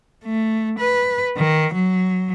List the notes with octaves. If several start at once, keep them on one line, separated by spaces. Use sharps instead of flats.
A3
B4
D#3
F#3